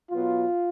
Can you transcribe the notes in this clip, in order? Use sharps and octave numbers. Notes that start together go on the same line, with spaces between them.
B2 F#3 B3 F4